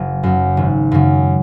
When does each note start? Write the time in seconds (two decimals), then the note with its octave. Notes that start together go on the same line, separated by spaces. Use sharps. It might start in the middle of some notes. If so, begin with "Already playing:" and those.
Already playing: F#1 C#3
0.23 F#2 C#3
0.57 G#1
0.92 F#2 C#3